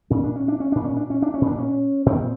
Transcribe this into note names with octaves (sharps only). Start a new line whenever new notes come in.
A#2 C#4
D4
C#4
D4
C#4
A#2 D4
C#4
D4
C#4
D4
C#4
A#2
D4
C#4
A#2 C4